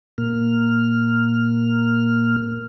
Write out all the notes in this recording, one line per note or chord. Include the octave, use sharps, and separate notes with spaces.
A#2 A#3 F6